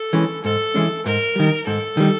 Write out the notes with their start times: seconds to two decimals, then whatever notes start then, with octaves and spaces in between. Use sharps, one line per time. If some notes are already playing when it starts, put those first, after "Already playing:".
Already playing: A4
0.13 E3 G#3 C#4
0.44 G#2 A4
0.74 E3 G#3 C#4
1.06 G#2 A#4
1.36 D#3 G3
1.67 G#2 A4
1.97 D#3 G3